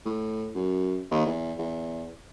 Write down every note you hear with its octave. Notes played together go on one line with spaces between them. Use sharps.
A2
F#2
D#2
E2
E2